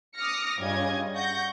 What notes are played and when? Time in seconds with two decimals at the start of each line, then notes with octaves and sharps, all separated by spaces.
0.18 D6 D#6 F6 A#6 C#7
0.59 G2 C#3 G3 F4 D#5 G#6
1.16 F#5 C#6 G6 A#6